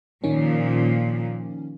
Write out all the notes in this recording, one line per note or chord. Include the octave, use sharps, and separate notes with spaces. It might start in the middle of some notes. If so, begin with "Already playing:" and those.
A#2 D#3 F3 C#4